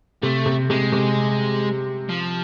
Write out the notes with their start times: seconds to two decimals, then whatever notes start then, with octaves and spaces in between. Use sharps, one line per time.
0.22 C3 A3
0.46 C3
0.70 C3 G#3
0.92 C3
2.09 F3